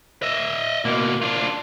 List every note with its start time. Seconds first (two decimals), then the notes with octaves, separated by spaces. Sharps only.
0.22 D#5 E5
0.85 B2 A#3
1.22 D4 F4